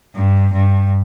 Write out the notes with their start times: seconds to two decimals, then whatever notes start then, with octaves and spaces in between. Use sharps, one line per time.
0.15 G2
0.53 G2